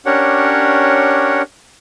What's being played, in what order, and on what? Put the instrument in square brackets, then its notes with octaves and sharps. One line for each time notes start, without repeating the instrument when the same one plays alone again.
[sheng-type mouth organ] C#4 D4 G4 A#4 C#5 F#5